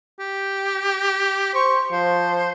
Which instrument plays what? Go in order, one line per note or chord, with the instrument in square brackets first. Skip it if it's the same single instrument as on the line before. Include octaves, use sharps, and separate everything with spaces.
[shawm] G4
[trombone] C5 [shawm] C#6
[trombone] F3 [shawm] C5